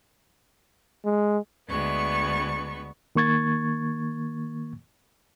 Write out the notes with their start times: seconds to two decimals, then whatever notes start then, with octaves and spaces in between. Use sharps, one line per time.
1.05 G#3
1.68 D2 G#3 B3 C#6
3.15 D#3 A#3 C#6 G#6 A6